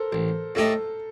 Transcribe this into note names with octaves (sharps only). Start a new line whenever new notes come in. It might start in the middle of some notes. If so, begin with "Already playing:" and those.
Already playing: A4 A#4 C5
A1 C5
A2 A3 D#4 G4 A4